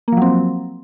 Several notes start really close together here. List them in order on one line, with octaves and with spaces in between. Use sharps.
A#3 F3 F#3 C4